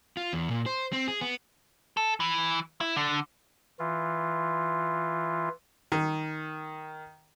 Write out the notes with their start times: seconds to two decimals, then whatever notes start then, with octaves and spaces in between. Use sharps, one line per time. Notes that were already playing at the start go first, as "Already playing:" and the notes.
0.17 F4
0.33 E2
0.51 A#2
0.66 C5
0.93 C4
1.08 G#4
1.21 B3
1.97 A4
2.20 E3
2.81 E4
2.96 D3
3.79 E3 F4
5.92 D#3